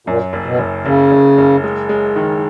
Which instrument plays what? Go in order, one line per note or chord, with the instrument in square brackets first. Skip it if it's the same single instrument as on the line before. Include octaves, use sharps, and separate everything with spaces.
[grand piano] F#2 [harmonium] A#2
[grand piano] F#1
[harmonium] B2
[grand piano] F#1
[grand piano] F#1 [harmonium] C#3
[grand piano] F#1
F#1
G#3
G#3
D#3